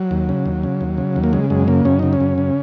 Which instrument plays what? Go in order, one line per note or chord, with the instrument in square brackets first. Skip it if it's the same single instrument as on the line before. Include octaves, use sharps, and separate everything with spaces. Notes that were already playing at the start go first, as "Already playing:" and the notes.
Already playing: [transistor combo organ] F#3
D#2
C#3
D#2
C#3
D#2
C#3
D#2
A#3
C#3 G#3
F#2 G#3
C#3 A#3
F#2 C#4
C#3 D#4
C#4
F#2
C#3